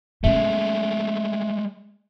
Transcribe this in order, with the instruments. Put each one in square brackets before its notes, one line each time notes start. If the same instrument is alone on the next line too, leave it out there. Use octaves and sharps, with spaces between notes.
[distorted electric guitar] G#3 A3 [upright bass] B3 C#4 [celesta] E5